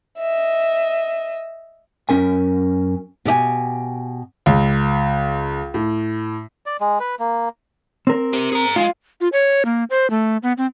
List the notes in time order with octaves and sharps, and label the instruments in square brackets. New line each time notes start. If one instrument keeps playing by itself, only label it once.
[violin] D#5 E5
[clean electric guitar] F#2 C#4 A#4 G#5
[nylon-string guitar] B2 G4 D#5 G#5
[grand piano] C#2
A2
[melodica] D5
G#3
B4
A#3
[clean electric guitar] C4 A#4
[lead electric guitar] G4 C5
G#4 A#5
[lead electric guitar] G#3 [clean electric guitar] F4
[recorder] F4
C#5
A#3
C5
A3
B3
C4